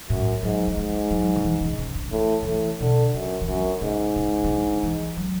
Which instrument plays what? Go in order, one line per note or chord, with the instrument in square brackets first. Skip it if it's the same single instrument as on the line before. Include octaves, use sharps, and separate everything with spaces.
[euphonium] F#2 [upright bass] A2
[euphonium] G#2 [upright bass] F#3
[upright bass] F#3
[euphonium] G#2 [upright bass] G#3
[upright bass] F#3
D3
E3
C#3
C#3
D3
[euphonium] A2 [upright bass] E3
[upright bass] D3
[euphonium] A2 [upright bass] E3
[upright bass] B2 [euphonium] D3
[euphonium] F#2 [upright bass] C#3
[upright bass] E3
[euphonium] F#2 [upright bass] D3
[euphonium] G#2 [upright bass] C#3
[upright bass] C#3
E3
D3
E3
F#3